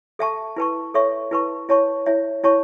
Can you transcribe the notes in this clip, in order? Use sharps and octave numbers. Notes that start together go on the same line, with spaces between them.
A4 E5 A5 C#6
E4 B4 A5 C#6
A4 C#5 E5 C#6
E4 B4 A5 C#6
E4 C#5 A5 C#6
E4 C#5 E5
E4 C#5 A5 C#6